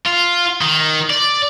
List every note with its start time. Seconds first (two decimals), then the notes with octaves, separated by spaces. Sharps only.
0.05 F4
0.61 D#3
1.10 D5